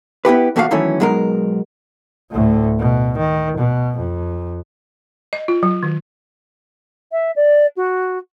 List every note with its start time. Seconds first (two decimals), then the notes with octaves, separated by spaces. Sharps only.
0.25 B3 E4 G4 B4
0.56 E2 A#2 A3 F#4 G4 F5
0.71 D#3 E3 F#3 A3 C#4
1.00 B2 F#3 G#3 D#4 A#4
2.31 D2 A2
2.79 B2
3.17 D#3
3.57 B2
3.97 F2
5.33 D#5
5.48 F4
5.63 F#3
5.83 D#3
7.12 E5
7.36 D5
7.76 F#4